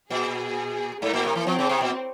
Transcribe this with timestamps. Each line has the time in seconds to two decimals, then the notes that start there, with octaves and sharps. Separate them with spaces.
0.10 A#2 G#4
1.01 G#2 A#3
1.13 A#2
1.25 C3
1.35 E3
1.47 F3 C4
1.59 C#3
1.69 C3
1.81 A#2